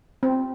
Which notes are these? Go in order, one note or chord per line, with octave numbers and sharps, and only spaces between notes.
C4